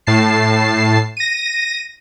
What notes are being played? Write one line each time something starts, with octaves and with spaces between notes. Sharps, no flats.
A2 A5 C7
A#6 D#7